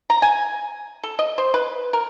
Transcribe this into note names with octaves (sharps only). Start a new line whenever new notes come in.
A#5
G#5
A4
D#5
C5
B4
A#4